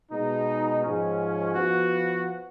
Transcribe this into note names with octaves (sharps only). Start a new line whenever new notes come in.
B2 G#3 D#4
G#2 F3 G#3 C#4
F3 B3 F#4